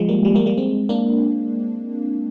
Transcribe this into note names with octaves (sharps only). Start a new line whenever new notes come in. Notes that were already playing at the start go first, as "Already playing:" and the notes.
Already playing: F3 G#3
G3 A#3
G3
G3 A#3
G3 A#3
G#3 C4
A#3 D4